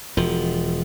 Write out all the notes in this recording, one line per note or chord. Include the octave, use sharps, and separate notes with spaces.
E1 F3